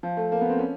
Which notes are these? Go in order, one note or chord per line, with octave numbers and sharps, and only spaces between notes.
F3
A3
A#3
B3
C4
C#4